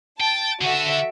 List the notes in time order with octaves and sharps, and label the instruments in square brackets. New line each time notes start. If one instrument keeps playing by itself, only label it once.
[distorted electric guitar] G5 [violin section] A5 A6
[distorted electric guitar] D3 D4 [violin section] F#4 A4 E5